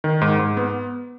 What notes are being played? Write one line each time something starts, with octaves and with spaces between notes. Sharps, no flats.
D#3
G#2
G#2
B3